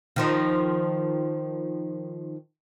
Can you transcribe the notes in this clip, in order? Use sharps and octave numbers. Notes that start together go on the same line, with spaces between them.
D#3 F3 D#4